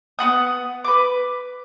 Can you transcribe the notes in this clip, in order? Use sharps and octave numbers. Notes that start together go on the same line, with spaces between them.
B3 F#4 F#5 D#6
B4 D6